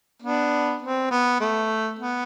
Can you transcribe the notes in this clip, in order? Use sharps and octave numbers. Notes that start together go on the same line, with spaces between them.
B3 D4
C4
B3
A3
B3